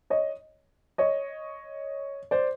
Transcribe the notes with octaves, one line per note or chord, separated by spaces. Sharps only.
C#5 D#5
C#5 D#5
C5 D5